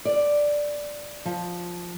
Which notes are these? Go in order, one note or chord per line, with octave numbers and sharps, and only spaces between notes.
D5
F3